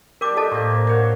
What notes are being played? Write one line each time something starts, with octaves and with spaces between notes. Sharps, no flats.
D4 G4 A#4 D6
A4 D#5 A5
A2 A#3 C4
A#4 C5 C#5 F#5